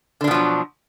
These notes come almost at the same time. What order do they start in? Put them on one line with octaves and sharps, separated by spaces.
D3 D4 B2 F3 F#3